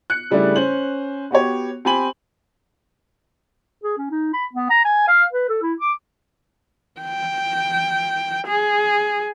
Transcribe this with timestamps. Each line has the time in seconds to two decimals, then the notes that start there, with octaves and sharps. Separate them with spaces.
0.10 F#6 C#7
0.31 C#3 G3 A3 D4 E4
0.56 C#4 C5 F#7
1.31 B3 F#4 G4 C#5
1.85 C4 G4 G#5 B5 F#7
3.84 G#4
3.98 C#4
4.11 D#4
4.34 B5
4.53 B3
4.70 A#5
4.85 G#5
5.08 F5
5.33 B4
5.49 A4
5.62 E4
5.80 D6
7.01 G5
8.48 G#4